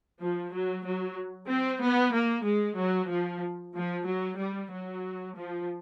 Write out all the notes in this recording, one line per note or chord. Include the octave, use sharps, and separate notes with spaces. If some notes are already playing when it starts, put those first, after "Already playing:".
F3
F#3
F#3
C4
B3
A#3
G#3
F#3
F3
F3
F#3
G3
F#3
F3